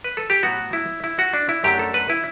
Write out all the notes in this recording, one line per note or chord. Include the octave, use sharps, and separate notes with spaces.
B4
A4
G4
A2 F#3 B3 F#4
E4
E4
F#4
D4
E4
F#2 D3 F#3 A3 D4 G4
A4
B4
E4